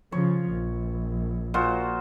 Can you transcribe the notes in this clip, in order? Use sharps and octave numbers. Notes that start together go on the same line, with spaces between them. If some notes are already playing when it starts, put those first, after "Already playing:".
C#3 F3 C#5
A#1
A#2 F#4 C5